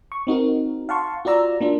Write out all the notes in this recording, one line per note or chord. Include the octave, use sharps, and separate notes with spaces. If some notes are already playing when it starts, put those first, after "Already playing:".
C#6
C4 D#4 F#4 A#4
F5 F#5 A5 C6 C#6
F4 F#4 D5 A#5 E6
A#3 D4 F4